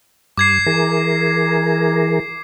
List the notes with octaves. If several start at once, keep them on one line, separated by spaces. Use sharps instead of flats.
G2 D6 G#6 C7
E3 G#4 A#4